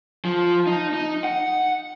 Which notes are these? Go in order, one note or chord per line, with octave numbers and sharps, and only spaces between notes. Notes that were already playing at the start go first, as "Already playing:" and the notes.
F3
D#4
D#4
F#5